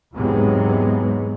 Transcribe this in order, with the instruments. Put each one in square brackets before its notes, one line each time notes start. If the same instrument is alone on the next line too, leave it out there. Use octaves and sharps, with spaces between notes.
[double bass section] E2 G#2 C3 F#3 G#3 B3